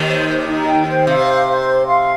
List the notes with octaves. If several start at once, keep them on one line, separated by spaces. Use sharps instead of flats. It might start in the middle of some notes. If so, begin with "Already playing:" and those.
Already playing: D#2 D#3
C5
G4
D#4
G5
C5
C3 F5
C5
C5
C6
F5